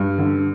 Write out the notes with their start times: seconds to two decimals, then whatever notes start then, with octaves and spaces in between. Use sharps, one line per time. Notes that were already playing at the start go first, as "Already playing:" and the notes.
Already playing: G2
0.18 D3